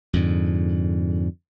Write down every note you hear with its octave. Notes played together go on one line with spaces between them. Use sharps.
F2 G#2 D3